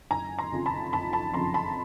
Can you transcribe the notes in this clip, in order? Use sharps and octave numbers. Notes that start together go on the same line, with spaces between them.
F#1 G#5 A#5
A#5 C6
F2 C#3 F3
A5 B5
F#1 A5 B5
A5 B5
F2 C#3 F3 A#5 C6
A5 B5